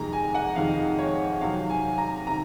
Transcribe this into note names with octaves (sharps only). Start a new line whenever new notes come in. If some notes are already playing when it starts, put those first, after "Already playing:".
Already playing: F2 C3 D#3 G#3 A#5
G#5
F#5
F2 C3 D#3 G#3 F5
C#5
C3 D#3 F#3 F5
G#5
A#5
C3 D#3 A#5